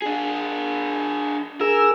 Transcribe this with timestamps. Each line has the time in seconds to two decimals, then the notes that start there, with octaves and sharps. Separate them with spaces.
0.02 D4 G#4
1.61 G#4 A#4 E6